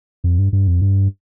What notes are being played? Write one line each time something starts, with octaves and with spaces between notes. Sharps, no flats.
F2
G2
G2
F2
G2